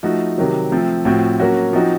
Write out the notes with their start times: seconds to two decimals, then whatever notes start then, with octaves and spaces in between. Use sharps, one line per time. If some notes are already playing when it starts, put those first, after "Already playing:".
0.03 F3 A3 D#4 F#4
0.38 C3 D#3 F#3
0.72 F3 A3 C4
1.05 A2 F3 C4 F#4
1.40 F#3 A#3 C#4 F#4
1.73 F3 C4 D#4 F#4